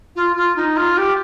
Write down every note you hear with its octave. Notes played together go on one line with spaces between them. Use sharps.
F4
F4
D#4
F4
G4